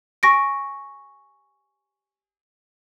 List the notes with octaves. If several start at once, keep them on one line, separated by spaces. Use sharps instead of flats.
G#5 C#6 A#6 D7